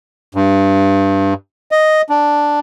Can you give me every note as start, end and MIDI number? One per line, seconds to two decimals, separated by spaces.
0.35 1.34 43
1.72 2.02 75
2.10 2.60 62